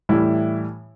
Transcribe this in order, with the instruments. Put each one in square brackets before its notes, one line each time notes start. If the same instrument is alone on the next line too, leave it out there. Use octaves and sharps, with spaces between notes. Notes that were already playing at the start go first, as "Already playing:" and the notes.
[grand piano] A2 E3 G3 E4